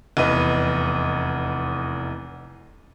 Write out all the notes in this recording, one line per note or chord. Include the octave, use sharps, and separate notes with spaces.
F1 E2 B4 D#5